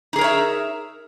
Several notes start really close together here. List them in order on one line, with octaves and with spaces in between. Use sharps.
D#4 G#4 A#4 C#5 E5